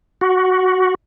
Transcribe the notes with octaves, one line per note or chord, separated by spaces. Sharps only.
F#4